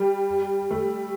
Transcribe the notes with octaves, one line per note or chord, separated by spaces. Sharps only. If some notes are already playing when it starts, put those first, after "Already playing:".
Already playing: G3
A3